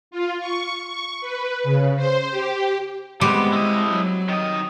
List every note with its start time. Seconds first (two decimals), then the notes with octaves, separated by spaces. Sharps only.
0.11 F4
0.40 C#6
0.84 C#6
1.21 B4
1.64 C#3
1.97 C5
2.31 G4
3.21 G3 G#3 B3 C4 G4
3.53 E4 D#5
3.89 F#3
4.28 D#3 D#5